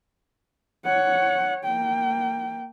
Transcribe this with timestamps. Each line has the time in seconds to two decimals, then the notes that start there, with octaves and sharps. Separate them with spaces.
0.85 C#5 F#5
1.64 A#3 G5